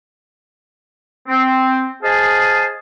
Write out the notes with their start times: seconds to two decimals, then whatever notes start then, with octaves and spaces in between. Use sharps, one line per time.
1.28 C4
2.03 G#4 C5 D#5 F5 G#5 A5